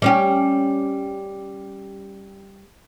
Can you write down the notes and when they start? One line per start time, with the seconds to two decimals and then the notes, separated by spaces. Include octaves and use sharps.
0.02 G3 C#4 G4